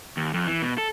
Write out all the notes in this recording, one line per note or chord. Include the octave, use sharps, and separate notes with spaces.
D#2
F2
E3
B2
A4